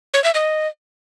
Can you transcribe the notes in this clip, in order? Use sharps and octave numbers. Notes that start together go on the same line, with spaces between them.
C#5
E5
D#5